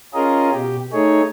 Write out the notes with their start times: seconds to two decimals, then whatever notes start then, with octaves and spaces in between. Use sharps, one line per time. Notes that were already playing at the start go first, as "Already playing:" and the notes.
0.14 C#4 F4 G#4 A#4 D#5
0.52 B2 G4
0.93 A3 D#4 G#4 C#5